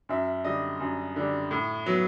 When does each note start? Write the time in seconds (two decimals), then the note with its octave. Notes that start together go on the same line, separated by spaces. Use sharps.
0.09 F#2 E5
0.44 D3 G3 D#5
0.80 F#2
1.16 D3 G3
1.51 A2
1.86 F#3 B3